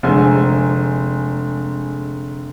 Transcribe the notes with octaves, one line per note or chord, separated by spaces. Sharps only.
F1 D3 G#3 C5 G#5